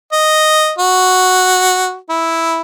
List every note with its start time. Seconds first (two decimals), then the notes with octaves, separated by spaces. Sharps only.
0.13 D#5
0.79 F#4
2.10 E4